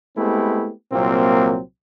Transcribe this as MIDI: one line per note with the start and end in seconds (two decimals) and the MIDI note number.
0.17 0.71 56
0.17 0.71 57
0.17 0.71 59
0.17 0.71 60
0.17 0.71 64
0.17 0.71 67
0.92 1.59 36
0.92 1.59 46
0.92 1.59 54
0.92 1.59 58
0.92 1.59 60